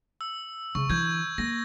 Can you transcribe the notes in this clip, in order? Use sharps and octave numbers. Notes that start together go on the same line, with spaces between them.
E6
C#3 C#6
D3 E3 G6 G#6
A#3 A#6